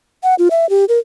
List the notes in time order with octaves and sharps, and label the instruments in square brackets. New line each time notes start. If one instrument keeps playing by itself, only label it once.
[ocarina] F#5
F4
E5
G4
A#4